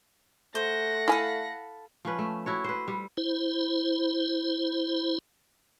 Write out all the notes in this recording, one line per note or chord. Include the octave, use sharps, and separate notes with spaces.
A3 C5 F#5 A#6
E4 A4 F5 G#5 B5
F3 C#4 B4
A3
E4 F#4 C#5
B4 C5
G3
E4 C5